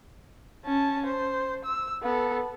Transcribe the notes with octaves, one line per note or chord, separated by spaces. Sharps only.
C#4 A5
C5
E6
B3 A4